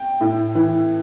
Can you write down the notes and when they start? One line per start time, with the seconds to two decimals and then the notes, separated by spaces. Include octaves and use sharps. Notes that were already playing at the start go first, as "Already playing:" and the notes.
Already playing: G5
0.21 A2
0.55 E3